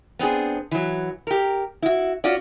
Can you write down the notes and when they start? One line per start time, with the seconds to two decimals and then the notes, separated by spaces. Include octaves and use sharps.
0.19 B3 C4 D4 G#4
0.71 E3 F#3
1.27 G4 A#4
1.82 E4 F#4
2.24 C#4 F4 F#4 D5